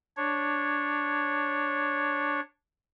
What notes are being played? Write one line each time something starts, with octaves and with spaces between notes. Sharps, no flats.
D4 C#5